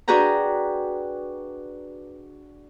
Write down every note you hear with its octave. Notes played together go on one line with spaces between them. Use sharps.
D4 F#4 G#4 B4 G5 A#5